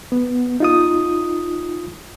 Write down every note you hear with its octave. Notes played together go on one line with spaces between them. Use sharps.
B3
D#4 F4 D#6